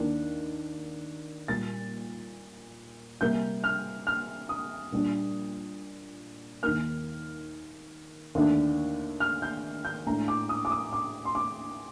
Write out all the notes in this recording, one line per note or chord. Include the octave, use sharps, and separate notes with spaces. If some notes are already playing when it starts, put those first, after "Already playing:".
Already playing: D#2 D#3 A#3 D4
A#2 G3 A#3 A6
C3 G3 A#3 G6
F6
F6
D#6
A#2 G3 D4
D#2 D#3 A#3 F6
D#2 D3 A3 D4
F6
G6
G6
A2 A3 D4 A#5
D6
D#6
D6
D#6
D6
C6
D6